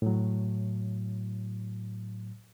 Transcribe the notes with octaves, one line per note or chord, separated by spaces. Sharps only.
A2 F#3